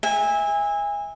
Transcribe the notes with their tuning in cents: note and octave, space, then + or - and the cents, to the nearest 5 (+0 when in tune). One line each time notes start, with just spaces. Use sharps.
E5 -20 G#5 -25